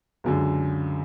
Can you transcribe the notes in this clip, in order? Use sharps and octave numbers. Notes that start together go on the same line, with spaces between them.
C#2 F#2 D3